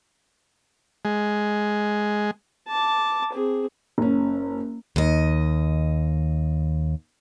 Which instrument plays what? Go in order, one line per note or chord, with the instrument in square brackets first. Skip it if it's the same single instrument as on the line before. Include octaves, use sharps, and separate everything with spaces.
[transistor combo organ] G#3
[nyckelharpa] A5 D6
C4 G#4
[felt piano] F#1 C#4
[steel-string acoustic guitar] D#2 D#5